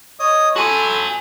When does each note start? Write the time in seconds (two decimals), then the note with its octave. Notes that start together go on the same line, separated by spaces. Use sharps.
0.20 C#5 D#5 D#6
0.56 F#4 A4 G#5 B5 C6